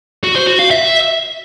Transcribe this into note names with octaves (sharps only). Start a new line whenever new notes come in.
F#4
C5
F#4
F5
E5